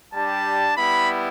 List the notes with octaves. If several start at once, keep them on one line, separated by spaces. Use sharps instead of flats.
G3 D4 G4 A5
G3 B3 E4 B5